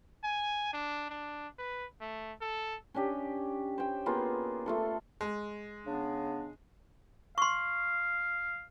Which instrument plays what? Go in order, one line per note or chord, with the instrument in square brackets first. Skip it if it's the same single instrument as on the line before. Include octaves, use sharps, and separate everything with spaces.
[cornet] G#5
D4
D4
B4
A3
A4
[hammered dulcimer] C#4 D4 G4 D#5
C5 G5
A#3 B3 F4 G#4
A3 F4 A4
[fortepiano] G#3
[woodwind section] C#3 B3 D4
[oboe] F5 [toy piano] C6 C#6